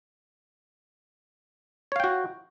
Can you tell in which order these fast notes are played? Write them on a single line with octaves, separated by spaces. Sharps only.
C#5 F5 G5 F#4